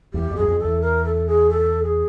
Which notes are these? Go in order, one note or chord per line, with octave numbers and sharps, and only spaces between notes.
E2 G4
F2
F#2 G#4
F2
A4
E2
A#4
A4
G#4
A4
G#4